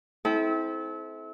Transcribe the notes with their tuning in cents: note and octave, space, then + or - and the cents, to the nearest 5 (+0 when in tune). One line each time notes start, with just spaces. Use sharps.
C4 +0 E4 -30 A4 -35